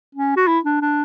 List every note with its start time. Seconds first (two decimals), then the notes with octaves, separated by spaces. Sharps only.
0.15 C#4
0.37 F#4
0.48 E4
0.65 D4
0.81 D4